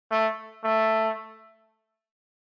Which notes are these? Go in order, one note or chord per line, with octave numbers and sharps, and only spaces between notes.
A3
A3